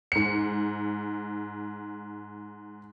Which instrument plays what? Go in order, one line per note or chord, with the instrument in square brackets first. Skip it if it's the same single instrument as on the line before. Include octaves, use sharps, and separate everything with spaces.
[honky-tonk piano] G#2 C#7